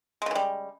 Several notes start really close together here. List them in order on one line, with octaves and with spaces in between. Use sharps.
G#3 C#3 E3 G3